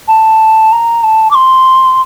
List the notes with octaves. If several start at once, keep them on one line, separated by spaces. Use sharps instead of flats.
A5
A#5
A5
D6
C6